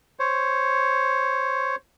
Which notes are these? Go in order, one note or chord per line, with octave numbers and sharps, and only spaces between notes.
C5 C#5